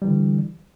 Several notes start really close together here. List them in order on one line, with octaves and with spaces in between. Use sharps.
G3 E3 D3